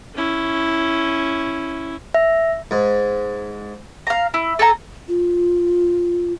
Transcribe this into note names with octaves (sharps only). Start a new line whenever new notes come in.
C#4 E4
E5
G#2
F5 A#5
E4
A4 G#5 A#5
F4